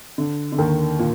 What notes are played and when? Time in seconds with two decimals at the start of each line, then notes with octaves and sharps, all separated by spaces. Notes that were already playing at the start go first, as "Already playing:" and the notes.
0.18 D3
0.52 D3
0.58 D#2 D#3
0.99 A#2